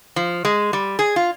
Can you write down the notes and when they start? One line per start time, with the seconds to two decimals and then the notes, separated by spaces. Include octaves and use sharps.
0.16 F3
0.45 G#3
0.73 G3
0.99 G#4
1.16 F4